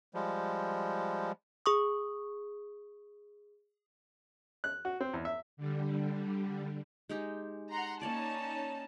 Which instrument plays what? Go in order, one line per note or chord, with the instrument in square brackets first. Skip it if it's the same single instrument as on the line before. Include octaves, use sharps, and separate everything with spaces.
[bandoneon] F3 G3 G#3
[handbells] G#4 C#6 D#6
[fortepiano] F#6
F#4
C4
E2
E5
[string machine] D3 G3
[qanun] G#3 D#4 G4
[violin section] F#5 A#5 C6
[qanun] A#3 C#5 D5 [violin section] C#4 D#4 A5